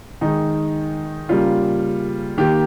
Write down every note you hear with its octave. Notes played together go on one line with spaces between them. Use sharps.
D#3 G#3 D#4
C#3 G3 A#3 F4
D#3 A#3 G4